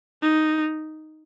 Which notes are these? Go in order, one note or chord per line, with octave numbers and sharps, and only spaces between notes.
D#4